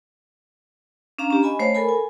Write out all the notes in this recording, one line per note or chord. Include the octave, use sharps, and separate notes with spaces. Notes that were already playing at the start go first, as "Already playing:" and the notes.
C#4 D4 F5 A#5
C#4 G4
D#5 G#5 B5
A3 C5 C#5 F5
A4 A#4 G#5 B5
G#5